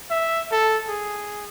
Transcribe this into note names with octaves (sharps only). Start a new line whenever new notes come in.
E5
A4
G#4